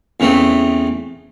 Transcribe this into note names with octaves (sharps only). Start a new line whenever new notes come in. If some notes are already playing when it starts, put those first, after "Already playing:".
E2 C#3 A3 C4